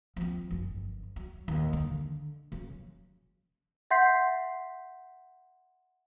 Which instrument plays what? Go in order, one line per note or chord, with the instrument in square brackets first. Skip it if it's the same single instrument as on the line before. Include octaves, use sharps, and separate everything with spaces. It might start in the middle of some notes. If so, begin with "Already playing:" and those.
[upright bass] F3 C4
G1 F#2
F#3
D#2
D3
C#3 F#3
[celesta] E5 F#5 C6 G6 B6 C7